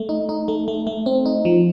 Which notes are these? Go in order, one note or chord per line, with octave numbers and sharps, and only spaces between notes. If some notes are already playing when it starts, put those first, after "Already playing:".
Already playing: A3
D#4
D#4
A3
A3
A3
C4
D#4
F3